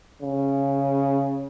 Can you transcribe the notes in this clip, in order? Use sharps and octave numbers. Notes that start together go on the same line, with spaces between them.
C#3